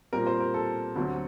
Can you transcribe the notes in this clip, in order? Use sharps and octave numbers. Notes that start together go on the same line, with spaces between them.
A#2 G3 C4 A#4
C5
A#4
A4
D2 D3 F#3 C4